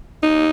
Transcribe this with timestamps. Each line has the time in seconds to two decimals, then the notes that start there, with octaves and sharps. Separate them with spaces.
0.23 D#4